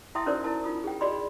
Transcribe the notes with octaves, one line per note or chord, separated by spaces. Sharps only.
E4 E5 G5 A5 C6 D#6
C#4 D#4 F#4 A#4 C5 D5
E4 A#4 A5
D#4 F4 D#6
G#4 G5
F#4 G#4 D5 D#5 B5 C6